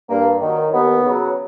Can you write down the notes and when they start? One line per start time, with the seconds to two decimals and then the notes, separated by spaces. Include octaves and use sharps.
0.09 G2 A#3
0.41 D#3 F#3
0.72 D#2 B3
1.04 C#3 F#3